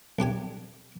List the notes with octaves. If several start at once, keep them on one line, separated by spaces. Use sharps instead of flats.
B1 D4 G4 G#5